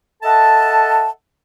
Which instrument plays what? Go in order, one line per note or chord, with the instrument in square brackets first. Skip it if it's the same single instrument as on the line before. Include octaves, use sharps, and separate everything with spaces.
[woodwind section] A4 D#5 E5 F#5 A5